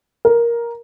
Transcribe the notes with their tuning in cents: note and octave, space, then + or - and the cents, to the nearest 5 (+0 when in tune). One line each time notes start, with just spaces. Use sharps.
A#4 +10